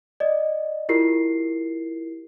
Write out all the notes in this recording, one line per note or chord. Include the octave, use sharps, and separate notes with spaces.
D5 D#5
E4 F4 G4 A#4 C7